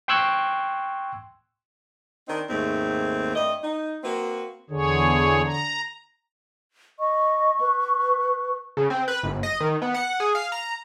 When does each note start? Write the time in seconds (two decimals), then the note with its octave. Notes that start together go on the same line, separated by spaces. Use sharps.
0.08 G5 C6 C#6 E6 F#6 G#6
2.27 D#3 C4 D4 D#4
2.49 D#2 G#2 A3 C4
3.35 G2 A3 D#5
3.63 D#4
4.03 A#3 C4 F#4 B4
4.70 E2 D3 G#4 C#5
5.45 A#5
6.99 D#5 C#6
7.60 B4
8.77 C#3
8.90 C4
9.08 B4
9.23 G1
9.43 D#5
9.60 D#3
9.82 B3
9.94 F#5
10.20 G#4
10.35 F5
10.52 A#5